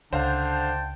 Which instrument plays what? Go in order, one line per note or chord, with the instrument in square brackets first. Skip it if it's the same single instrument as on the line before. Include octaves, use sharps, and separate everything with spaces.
[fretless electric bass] C#2 [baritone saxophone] D3 [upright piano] C5 F5 [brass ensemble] G5 A5